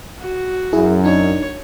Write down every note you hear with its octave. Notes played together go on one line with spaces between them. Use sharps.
F#4
F#2 E4 G#4
D4 D#4 C#5